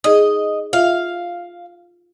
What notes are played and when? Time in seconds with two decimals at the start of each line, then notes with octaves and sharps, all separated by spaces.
0.04 D#4 G#4 D#5
0.73 F4 E5 F5